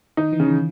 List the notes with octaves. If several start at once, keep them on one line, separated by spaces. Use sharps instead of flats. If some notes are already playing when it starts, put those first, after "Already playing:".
D#3 D#4
E3
C#3
D#3